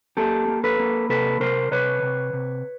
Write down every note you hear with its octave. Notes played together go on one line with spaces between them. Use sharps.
A#3 G4 A4
A#3
A4 B4
A#3
C3 A4 B4
C3 A#4 C5
C3 B4 C#5
C3
C3